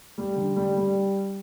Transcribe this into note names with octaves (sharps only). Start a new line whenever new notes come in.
G3
D3
G3
G3